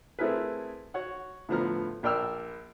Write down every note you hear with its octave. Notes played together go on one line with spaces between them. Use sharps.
A3 C4 E4 G#4 A#4 B4
F#4 C#5 F#5
A2 D3 F3 B3 A#5 F6
A#1 A#4 D5 G5 E6 F6